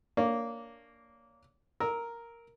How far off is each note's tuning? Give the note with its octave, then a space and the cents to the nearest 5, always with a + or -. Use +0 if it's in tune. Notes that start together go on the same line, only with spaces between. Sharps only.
A#3 -10 D4 -10 C#5 +5
A#4 +0 E6 -25